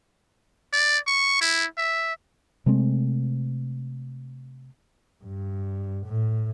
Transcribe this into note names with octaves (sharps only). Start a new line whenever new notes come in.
D5
C#6
E4
E5
C3 G#3 A3 C4
G2
A2